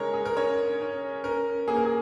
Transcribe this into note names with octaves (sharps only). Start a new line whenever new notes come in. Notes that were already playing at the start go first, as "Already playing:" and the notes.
Already playing: C#3 G#3 A#4 C#5
G#4
A#4
C#4 C#5
C#4
C#4 A#4
A#3 G#4
A#4
G#4